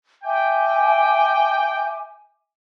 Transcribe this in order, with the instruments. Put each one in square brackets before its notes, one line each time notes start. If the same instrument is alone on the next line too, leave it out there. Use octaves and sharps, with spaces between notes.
[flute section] E5 G#5 D6 [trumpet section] G5